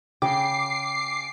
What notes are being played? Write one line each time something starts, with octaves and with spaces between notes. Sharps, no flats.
C#3 G5 D6 C7